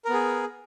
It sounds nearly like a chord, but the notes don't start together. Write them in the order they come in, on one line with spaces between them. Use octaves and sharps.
A#4 B3 G#4